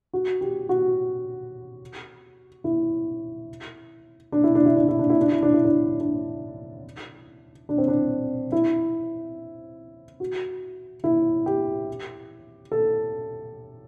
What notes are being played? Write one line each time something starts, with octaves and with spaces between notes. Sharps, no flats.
F#4
G4
F#4
E4
D4
E4
D4
E4
D4
E4
D4
E4
D4
E4
D4
E4
D4
D4
D4
C4
D4
E4
F#4
E4
G4
A4